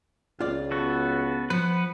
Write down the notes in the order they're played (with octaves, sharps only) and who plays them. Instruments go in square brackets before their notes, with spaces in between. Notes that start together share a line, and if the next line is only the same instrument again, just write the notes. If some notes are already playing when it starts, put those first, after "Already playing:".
[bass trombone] C#2 [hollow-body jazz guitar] F4 D5
[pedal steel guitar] B3 F#4 A4
[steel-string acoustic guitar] F3 [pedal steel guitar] B4 F#5